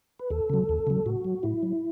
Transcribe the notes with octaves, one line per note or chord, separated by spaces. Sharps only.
B4
D#2 A4
C#3 F#3
D#2
C#3 F#3
A2 F#4
F#3
A2 E4
F#3